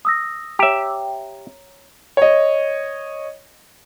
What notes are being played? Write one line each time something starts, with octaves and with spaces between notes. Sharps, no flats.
D#6 E6 A#6
G4 C#5 E5 A#5
C#5 D#5